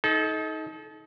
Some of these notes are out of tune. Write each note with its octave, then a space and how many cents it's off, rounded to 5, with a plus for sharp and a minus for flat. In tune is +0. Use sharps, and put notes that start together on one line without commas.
D#4 +25 A4 -30